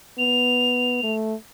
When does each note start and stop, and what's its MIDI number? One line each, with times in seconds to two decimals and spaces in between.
0.18 1.03 59
0.18 1.15 101
1.03 1.34 57